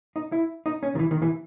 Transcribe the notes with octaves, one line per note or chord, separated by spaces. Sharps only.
D#4
E4
D#4
C#4
D#3
E3
D#3
E3